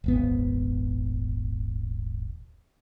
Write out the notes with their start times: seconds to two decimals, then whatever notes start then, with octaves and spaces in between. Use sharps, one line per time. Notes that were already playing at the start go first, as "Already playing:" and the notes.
0.04 D#1 G#1 B3